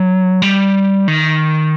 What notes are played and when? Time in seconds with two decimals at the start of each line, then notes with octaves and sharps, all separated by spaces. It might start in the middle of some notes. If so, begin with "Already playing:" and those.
Already playing: F#3
0.42 G3
1.08 D#3